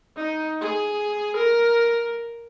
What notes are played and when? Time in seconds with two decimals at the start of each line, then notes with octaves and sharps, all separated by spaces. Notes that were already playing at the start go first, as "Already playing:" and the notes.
0.17 D#4
0.61 G#4
1.37 A#4